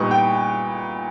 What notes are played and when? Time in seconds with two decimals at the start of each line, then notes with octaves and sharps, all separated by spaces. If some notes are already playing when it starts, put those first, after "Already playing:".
Already playing: A#2 G3 B3 D#4 C#6 D#6
0.11 G5